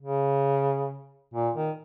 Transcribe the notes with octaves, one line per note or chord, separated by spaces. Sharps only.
C#3
A#2
D#3